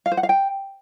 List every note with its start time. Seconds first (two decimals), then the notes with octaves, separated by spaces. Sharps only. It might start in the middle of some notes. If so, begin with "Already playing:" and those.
0.06 F5
0.12 C5
0.17 F#5
0.23 F5
0.29 G5